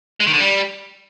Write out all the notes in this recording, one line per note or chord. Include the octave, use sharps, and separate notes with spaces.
G#3
D#3
D3
G3